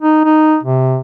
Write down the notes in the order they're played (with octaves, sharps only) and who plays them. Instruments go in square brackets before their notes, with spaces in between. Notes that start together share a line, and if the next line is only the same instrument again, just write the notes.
[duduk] D#4
D#4
C3